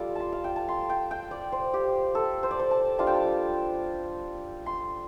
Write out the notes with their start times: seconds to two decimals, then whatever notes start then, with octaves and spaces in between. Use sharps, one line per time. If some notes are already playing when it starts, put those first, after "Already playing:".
Already playing: G3 F4 A4 D6
0.15 A5 C6
0.32 F5
0.44 G5
0.56 A5
0.68 C6
0.89 G5
1.11 G5
1.31 D5
1.52 C5
1.74 G4
2.15 A4
2.43 C5
2.51 D5
2.59 C5
2.71 A5
2.99 G3 D4 F4 A5
3.07 G5
3.15 A5
4.66 C6